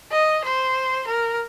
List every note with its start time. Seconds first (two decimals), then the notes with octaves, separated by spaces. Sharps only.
0.12 D#5
0.44 C5
1.07 A#4